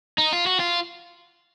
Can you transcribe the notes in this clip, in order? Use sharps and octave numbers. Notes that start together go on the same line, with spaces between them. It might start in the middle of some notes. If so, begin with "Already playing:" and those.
D#4
F4
F#4
F4